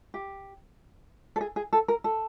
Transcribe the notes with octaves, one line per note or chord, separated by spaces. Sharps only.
G4
A4
G#4
G#4
A4
A#4
A4